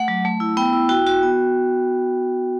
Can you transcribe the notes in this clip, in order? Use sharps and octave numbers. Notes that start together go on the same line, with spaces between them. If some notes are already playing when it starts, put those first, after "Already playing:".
Already playing: A3 F#5
F#3
A3
E4
B3 G5
E4
F#4 G5
F#4
B3